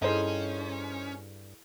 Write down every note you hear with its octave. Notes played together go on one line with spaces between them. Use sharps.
G2 C#4 D#4 E4 G#4 A4 C5